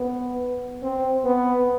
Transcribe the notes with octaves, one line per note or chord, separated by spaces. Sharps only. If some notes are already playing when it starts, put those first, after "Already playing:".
Already playing: B3
C4
B3